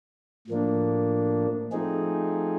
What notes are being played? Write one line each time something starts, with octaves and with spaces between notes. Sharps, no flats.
A2 F3 A#3 D4
F3 A3 C4 D#4 G#4